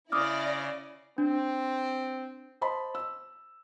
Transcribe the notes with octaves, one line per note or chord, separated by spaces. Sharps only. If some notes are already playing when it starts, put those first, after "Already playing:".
C#3 E4 D5 D6 D#6 F6 A#6
C4 D4
C5 D#5 A5 B5 C6
E6